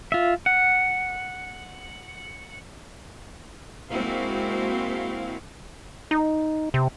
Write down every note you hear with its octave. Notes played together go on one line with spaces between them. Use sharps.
F4 E5
F#5
G#3 A#3 C4 E4 F#4 F5
D#4
C3